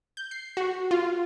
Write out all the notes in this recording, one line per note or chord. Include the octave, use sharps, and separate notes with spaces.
G6
C7
F#4
F4